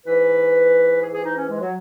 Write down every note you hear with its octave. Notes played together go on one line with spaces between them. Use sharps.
G#2 E3 B4
G#4
G#4
D#4
C#4
G#3
F#3